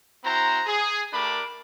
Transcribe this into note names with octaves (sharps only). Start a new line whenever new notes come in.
C4 E4 F#4 C5 A#5
G#4
A3 D4 G4 A#4 B5 D6